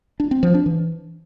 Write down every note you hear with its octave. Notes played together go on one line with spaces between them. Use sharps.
D4
C4
F3
D4
E3